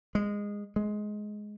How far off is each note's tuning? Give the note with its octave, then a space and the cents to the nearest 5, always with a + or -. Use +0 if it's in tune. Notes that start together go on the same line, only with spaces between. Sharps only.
G#3 -15
G#3 +15